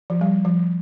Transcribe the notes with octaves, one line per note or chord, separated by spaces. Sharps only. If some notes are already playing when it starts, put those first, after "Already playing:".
F3
G3
F3